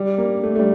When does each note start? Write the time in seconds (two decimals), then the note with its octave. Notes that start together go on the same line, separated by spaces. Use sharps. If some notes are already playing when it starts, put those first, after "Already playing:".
Already playing: G3
0.18 A#3
0.43 A3
0.55 A3
0.59 G3